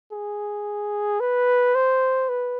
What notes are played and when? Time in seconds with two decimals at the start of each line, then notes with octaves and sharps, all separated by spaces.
0.12 G#4
1.20 B4
1.75 C5
2.29 B4